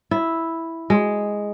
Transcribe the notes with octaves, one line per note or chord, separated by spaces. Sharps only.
E4
G#3